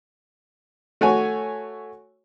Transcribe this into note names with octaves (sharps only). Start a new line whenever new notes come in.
A3 F#4 C#5 G#5